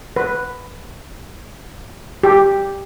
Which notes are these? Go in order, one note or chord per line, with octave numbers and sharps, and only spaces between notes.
B4
G4